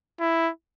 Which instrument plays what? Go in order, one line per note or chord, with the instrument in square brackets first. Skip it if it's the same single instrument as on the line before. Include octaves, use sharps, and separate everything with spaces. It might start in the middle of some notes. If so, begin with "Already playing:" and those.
[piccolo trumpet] E4